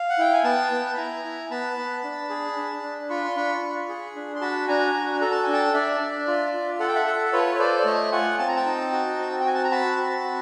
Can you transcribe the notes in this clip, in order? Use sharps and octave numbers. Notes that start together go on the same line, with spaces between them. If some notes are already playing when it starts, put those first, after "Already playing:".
Already playing: F5
F#5
E4 G5
G#5
B3 G5 A5
B3
B5
E4 G#5 A#5
E4
B3 A5 B5
B3
D4
G#4
D4
D4
F4 B5 C#6
C6
D4 B5 C#6
F4
G#4
D4
C6
F#4 A5 B5
D4 G#5 A#5
F#4
A4 A#5
A5
D4 G#5
G5 A5
D4 D5 E5
D4
F4
F4
A4 F#5
G5
E5 F#5
A4
F4 B4 C#5
C#5
A4 C5 D5
D5
A3 C#5 D#5
F4 F#5 G#5
C4 A5
A#5
G5 A5
D#4
F#4
C4
G5
F#4 G#5
A5
A#5
F#4 A5 B5
C4
F#4